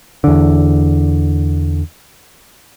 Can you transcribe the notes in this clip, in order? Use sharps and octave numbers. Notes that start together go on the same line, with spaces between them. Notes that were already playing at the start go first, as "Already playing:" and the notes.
E2 D3